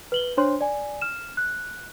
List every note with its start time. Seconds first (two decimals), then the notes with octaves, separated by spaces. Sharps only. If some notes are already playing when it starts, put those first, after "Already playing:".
0.12 B4 F#7 G7
0.37 D4 C5 C#5 C6
0.61 D5 G#5
1.01 F6 E7
1.37 F#6